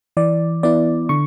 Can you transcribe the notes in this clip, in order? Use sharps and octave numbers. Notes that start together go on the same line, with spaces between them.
E3 D5
B3 E4 D5
D3 C#6